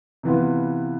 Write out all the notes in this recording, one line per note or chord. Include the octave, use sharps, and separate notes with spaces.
C3 E3 B3 F4